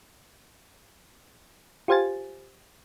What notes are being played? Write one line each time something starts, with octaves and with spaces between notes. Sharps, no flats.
F4 G4 C5 F5 G#5 A6